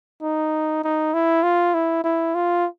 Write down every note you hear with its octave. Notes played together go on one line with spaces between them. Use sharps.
D#4
D#4
E4
F4
E4
E4
F4